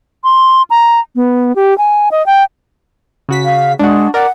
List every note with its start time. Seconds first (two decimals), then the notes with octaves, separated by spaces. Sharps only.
0.24 C6
0.70 A#5
1.16 B3
1.56 G4
1.78 G#5
2.11 D#5
2.26 G5
3.29 C#3 F#4 B6
3.45 F5
3.79 G#3 D4 F#4
4.14 A#4 D5 F#5